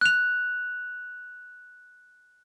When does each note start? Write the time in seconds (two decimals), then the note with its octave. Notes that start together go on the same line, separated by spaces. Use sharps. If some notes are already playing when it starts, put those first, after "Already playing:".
0.01 F#6 F7